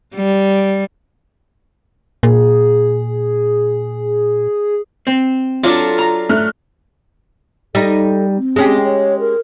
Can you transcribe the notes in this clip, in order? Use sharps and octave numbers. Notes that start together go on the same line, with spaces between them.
G3
A#2 G#4
C4
F#3 D4 F4 A4
A#5
A3 F6 F#6
G3 D#4 A4
C4
G#3 C#4 G4
C#5
A#4